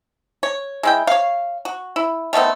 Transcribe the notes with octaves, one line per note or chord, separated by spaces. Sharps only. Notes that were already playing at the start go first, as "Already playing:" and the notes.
C#5
G#3 E4 G5
C#5 F5
F#4
E4
D#3 A3 B3 C4